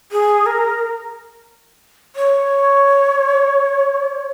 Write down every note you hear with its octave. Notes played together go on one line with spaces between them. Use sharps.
G#4
A#4
C#5